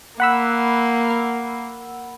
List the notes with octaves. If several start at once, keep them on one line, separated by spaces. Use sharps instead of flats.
A#3 F#5 B5 E6